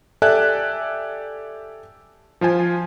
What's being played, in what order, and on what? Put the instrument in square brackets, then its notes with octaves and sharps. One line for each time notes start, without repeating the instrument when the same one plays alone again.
[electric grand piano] G4 A4 D5 E5 G#5 F#6
F3 F4 C5 G#5